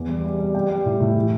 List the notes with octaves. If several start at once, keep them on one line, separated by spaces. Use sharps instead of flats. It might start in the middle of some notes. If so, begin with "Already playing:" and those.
Already playing: E2
G3
G3
G3
G3 G5
G3
A2
A2
E3